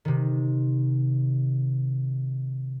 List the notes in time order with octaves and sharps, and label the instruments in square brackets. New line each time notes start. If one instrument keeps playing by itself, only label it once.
[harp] C3 D#3